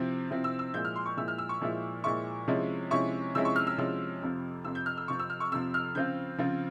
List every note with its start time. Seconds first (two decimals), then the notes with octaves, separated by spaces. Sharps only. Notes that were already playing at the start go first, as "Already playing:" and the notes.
Already playing: C3 F3 C4 E4
0.30 C3 F3 C4 E4
0.44 E6
0.59 E6
0.74 A#2 F3 G#3 E4 G6
0.85 F6
0.96 C6
1.06 C#6
1.17 A#2 F3 G#3 E4 E6
1.28 F6
1.38 E6
1.49 C#6
1.61 A#2 F3 G#3 E4
2.04 A#2 F3 G#3 E4 C#6
2.47 C3 F3 G#3 C#4 E4
2.91 C3 F3 G#3 C#4 E4 C#6
3.35 C3 F3 G#3 C#4 E4 E6
3.45 C#6
3.56 F6
3.67 E6
3.78 C3 F3 G#3 C#4 E4 E6
4.22 F2 C3 F3
4.65 F2 C3 F3 E6
4.75 G6
4.86 F6
4.97 E6
5.08 F2 C3 F3 C#6
5.19 E6
5.30 F6
5.40 C#6
5.51 F2 C3 F3 E6
5.74 F6
5.95 C#3 F3 C4 F4 G6
6.39 C#3 F3 C4 F4